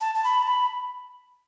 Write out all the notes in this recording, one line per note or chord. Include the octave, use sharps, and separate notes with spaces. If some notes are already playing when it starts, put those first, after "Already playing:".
A5
A5
B5
A5
B5